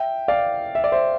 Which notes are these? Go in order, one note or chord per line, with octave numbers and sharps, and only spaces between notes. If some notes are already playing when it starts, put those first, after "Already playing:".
Already playing: E5 G5
D5 F5
E5
D5
C5 E5